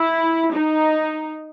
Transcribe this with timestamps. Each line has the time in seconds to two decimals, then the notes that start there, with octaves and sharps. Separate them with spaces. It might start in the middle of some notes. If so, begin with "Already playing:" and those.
Already playing: E4
0.53 D#4